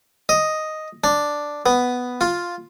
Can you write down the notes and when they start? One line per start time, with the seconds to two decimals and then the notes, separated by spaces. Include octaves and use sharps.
0.29 D#5
1.04 D4
1.66 B3
2.21 F4